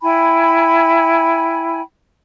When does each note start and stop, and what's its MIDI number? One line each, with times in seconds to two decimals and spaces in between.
0.02 1.81 64
0.02 1.81 79
0.02 1.81 80
0.02 1.81 83